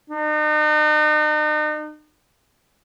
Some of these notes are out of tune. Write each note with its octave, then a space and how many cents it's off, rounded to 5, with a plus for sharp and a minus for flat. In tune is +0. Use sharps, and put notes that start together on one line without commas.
D#4 -40